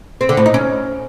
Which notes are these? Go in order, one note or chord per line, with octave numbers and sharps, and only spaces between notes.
C4
D3
A2
D#4
C#4